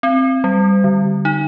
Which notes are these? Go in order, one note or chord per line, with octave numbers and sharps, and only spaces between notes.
C4
G3
D3
D#4